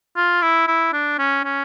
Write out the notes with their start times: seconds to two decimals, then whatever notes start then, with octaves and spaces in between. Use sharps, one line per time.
0.16 F4
0.42 E4
0.68 E4
0.93 D4
1.18 C#4
1.44 C#4